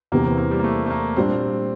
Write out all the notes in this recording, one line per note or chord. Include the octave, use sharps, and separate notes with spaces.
E2 C3 E3 A#3
C4
A#3
G3
A#3
A3
A3
A#3
A#2 G3 C4 D4